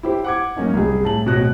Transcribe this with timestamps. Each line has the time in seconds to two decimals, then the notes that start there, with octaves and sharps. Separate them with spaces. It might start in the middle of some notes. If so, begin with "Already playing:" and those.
0.03 E4 G4 C5
0.24 F#5 D6 G#6
0.57 F#2 A#3 C#4 D#4
0.73 C2 G#4
1.04 A2 A5 F#7
1.26 D1 B2 C#5 F#6 A#6